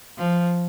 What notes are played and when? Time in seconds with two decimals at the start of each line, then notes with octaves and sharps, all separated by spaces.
0.18 F3